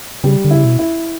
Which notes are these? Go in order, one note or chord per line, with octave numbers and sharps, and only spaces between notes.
C#3 G3
D3
C#3 E4
B2
E4